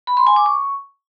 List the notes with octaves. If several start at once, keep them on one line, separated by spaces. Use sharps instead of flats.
B5
C6
G#5
D6
C#6